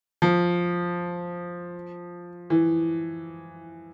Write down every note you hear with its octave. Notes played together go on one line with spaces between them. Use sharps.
F3
E3